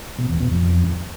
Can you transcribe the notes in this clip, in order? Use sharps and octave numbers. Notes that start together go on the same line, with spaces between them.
B2
E2
B2
F2